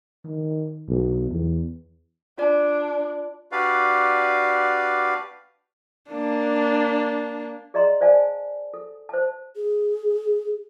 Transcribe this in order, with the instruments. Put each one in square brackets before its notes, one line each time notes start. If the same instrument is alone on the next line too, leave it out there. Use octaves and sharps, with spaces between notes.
[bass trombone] D#3
B1
E2
[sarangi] D4 [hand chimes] F4 D5
[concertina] D4 F#4 G4 B4 D5 F5
[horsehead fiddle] A#3 D4
[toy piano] G#4 D5 D#5 A#5 C6
C5 D5 F5 G#5 A5
A4
C5 A5
[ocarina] G#4